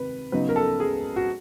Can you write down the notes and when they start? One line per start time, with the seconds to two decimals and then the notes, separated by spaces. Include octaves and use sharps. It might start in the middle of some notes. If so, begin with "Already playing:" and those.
Already playing: C3 D#3 B4
0.32 C#3 F#3 B3 D#4 B4
0.49 A#4
0.56 A4
0.80 G#4
1.16 F#4